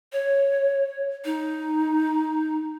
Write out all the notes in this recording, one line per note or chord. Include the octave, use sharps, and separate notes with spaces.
C#5
D#4